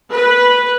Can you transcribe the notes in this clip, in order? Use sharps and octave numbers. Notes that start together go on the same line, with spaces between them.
B4